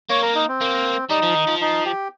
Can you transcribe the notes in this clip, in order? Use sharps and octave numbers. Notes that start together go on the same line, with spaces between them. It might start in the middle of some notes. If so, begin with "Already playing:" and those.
A#3 C#5
A#4
D#4
C4
A#3
G3 D#4
F3
D#3
F3
D#4
G4